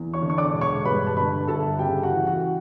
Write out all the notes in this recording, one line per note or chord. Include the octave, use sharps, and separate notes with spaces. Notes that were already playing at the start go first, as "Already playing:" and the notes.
Already playing: E2
C#5 C#6
D3
C#6
D5 D6
E1
C#5 C#6
G2 B4 B5
A5
D3 B4 B5
G1 A4 A5
C#3 G4 G5
F#4 F#5
E3
F#4 F#5